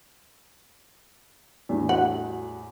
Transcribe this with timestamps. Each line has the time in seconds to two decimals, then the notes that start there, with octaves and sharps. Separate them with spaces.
1.69 E2 A2 G3 D4
1.89 F#4 F#5